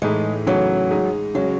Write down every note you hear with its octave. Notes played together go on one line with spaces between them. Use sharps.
A2 E3 G#3 A3 D#4 G#4
C#3 E3 F#3 A3 D#4
G#3 D#4 G#4
C#3 F#3 G#3 C#4